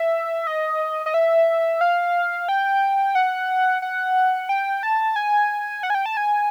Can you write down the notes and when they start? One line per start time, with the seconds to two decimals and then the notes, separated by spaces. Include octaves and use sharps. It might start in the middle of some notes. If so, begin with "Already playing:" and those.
Already playing: E5
0.47 D#5
1.06 D#5
1.14 E5
1.81 F5
2.49 G5
3.15 F#5
3.82 F#5
4.49 G5
4.83 A5
5.16 G#5
5.83 F#5
5.90 G#5
5.95 G5
6.06 A5
6.17 G#5